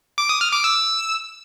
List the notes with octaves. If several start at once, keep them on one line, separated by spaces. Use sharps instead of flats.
D6
D#6
F6
D6
E6